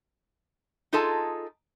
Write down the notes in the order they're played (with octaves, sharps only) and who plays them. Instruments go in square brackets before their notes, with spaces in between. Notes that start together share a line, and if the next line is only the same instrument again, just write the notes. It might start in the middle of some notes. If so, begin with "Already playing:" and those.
[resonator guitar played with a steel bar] D#4 F4 G#4 A4 D#5 A5